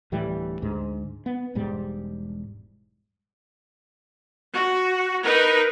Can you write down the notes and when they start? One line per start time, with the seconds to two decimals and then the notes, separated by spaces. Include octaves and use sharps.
0.12 D1 A2 E3 G3
0.62 D2 G#2
1.26 B3
1.55 E1 G#2 G3
4.52 F#4
5.22 D#4 A#4 B4